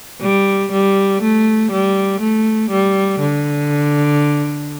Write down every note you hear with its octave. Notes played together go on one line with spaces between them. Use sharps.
G3
G3
A3
G3
A3
G3
D3